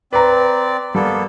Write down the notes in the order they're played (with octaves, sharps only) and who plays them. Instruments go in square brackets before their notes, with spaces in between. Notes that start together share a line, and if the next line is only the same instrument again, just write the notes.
[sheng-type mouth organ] C4 D5 [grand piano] B4 A#5
[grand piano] G3 [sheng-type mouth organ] A#3 B3 A4